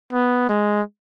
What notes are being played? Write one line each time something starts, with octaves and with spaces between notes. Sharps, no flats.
B3
G#3